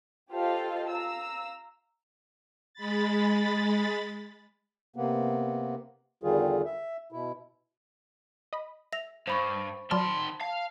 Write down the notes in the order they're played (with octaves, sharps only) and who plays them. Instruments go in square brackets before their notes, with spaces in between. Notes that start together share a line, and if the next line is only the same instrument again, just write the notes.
[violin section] F4 G4 A4 C5 D#5 F5
F5 A#5 E6
[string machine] G#3 B5 A6
[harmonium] C3 A#3 B3
E2 D3 D#3 G3 F4 G#4
E5
B2 E4
[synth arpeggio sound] D#5 B5
[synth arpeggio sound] E5 [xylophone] A#6 F7
[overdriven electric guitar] G2 [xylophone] C5 B5 C#6
[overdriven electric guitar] D#3 C6 [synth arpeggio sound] F#3 D5 F6 [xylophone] A5 B5
[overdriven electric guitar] F5 [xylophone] A5